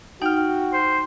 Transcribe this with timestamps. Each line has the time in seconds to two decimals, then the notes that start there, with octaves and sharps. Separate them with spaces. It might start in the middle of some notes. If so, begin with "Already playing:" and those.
0.22 D#4 F#4 G5 F6
0.73 C5